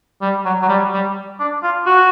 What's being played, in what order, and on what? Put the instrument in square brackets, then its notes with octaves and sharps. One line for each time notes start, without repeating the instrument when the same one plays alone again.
[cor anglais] G3
F#3
F#3
G3
G3
D4
F4
F#4